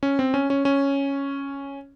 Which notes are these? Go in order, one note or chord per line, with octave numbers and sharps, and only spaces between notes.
C#4
C4
C#4
C#4
C#4